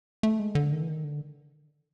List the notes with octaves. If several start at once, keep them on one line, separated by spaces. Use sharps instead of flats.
A3
G#3
D3
D#3
E3
D#3
D3